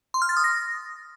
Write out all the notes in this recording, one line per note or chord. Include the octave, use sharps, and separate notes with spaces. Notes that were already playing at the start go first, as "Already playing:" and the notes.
C6
F6
A6
D#6
A#6